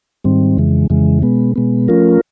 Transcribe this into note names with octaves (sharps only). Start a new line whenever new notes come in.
G#2 D#3 G3 C4
F2 C#3 E3 G#3
F2 C#3 E3 G#3
B2 G#3 B3
B2 G#3 B3
F3 A3 C#4 F4 A#4